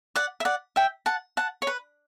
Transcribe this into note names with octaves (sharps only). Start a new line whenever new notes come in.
D5 F#5
E5
D5 F#5
E5 G5
F#5 A5
F#5 A5
C#5
B4